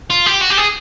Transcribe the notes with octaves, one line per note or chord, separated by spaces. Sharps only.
F4
G4
F#4
G4
G#4